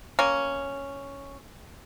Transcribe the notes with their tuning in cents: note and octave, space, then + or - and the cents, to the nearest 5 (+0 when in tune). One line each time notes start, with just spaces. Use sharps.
A#3 +0 C#4 +0